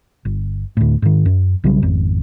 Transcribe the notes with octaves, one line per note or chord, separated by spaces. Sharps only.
G1
D2 A2
G#2 D#3
F#2
B1 C#3 F#3 G3
G#1 F2